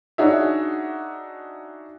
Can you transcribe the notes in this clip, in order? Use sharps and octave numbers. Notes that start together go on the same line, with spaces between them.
D4 D#4 F#4 G#4 C#5 E5